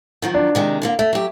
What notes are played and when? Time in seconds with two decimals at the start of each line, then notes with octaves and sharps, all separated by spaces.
0.22 D#3 F3 F#3
0.34 D4
0.55 C3 D#3 G#3
0.82 D3 G#3 A#3
0.99 A3 E5
1.13 F#3 G4